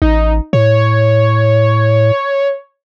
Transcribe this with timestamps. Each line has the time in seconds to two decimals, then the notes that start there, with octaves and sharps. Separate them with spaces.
0.02 A1 D#4
0.53 A2 C#5